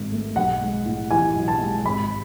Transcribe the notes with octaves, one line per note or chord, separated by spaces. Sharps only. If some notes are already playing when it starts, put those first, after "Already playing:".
Already playing: G#1 G#2 D#3
A3
B1 F#5
G#3
A2
E3 G#5
B1
A5
G#3
G#1 B5